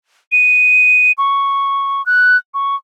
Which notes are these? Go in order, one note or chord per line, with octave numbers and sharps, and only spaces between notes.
D#7
C#6
F#6
C#6